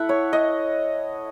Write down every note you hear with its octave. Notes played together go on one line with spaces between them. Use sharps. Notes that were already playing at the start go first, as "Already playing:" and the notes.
Already playing: A3 E4 E5 F#5 A5
C#5
D#5